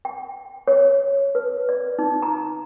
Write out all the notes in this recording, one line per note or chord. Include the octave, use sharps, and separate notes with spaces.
G5
C#5
B4
D5
D#4
A#5